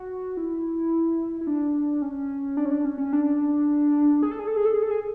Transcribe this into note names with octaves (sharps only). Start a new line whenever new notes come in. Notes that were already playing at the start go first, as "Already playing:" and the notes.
Already playing: F#4
E4
E4
D4
C#4
D4
C#4
D4
C#4
C#4
D4
G#4
A4
G#4
A4
G#4
A4
G#4
A4
G#4